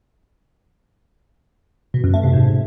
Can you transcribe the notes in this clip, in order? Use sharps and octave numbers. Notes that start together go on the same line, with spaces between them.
B2
F#2
A3
C3
G#2